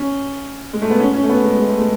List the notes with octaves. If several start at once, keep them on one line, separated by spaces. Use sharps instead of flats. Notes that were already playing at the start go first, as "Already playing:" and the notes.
Already playing: C#4
G#3
A3
B3
C#4
C#4
A3
B3
G#3
G#3
A3
G#3